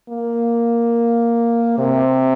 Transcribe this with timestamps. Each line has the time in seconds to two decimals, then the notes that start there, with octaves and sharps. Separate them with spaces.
0.09 A#3
1.78 C3